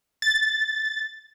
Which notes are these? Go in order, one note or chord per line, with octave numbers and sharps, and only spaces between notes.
A6